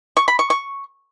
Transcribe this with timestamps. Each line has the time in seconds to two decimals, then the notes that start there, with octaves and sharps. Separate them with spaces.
0.17 C#6
0.28 B5
0.39 C#6
0.50 C#6